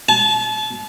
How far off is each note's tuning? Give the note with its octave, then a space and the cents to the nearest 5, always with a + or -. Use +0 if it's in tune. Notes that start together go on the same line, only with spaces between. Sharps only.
A5 -35